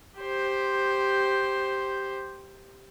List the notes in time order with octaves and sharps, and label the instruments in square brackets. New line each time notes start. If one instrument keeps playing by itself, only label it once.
[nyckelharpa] G4 C5